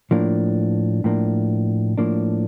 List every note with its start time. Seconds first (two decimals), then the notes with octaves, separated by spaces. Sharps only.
0.11 A2 F3 A#3 D4
1.04 A2 F3 A#3 D4
1.98 A2 F3 A#3 D4